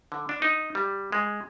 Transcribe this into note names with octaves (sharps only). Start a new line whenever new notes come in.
D3
D4
D#4
G3
G#3